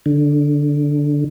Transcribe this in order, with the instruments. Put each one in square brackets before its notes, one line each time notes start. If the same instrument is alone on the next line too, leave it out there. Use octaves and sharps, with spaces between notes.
[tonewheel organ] D3